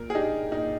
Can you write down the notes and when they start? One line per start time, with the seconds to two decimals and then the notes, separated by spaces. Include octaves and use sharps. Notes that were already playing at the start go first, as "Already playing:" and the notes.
Already playing: A#2 A#4
0.10 G#4
0.15 D4 D#4 G4
0.52 A#2 D#4